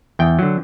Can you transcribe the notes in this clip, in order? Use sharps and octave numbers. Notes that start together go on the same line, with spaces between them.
E2 G5
D3 F#3